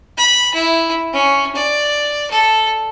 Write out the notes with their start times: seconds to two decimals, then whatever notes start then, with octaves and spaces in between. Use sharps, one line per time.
0.17 B5
0.54 E4
1.13 C#4
1.55 D5
2.31 A4